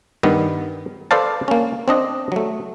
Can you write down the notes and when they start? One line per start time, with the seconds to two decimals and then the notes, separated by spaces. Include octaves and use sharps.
0.23 G2 D#3 B3
1.11 A4 B4 C5 D5 F5 A5
1.48 A#3 C#4
1.88 C4 D4 D#5
2.32 F#3 A3